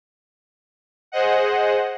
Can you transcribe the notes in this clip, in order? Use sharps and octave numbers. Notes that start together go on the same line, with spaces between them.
G#4 C5 D#5 F#5